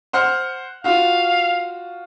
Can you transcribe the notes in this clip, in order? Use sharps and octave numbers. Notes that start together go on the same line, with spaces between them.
C5 F#5 F6
F4 F#4 F5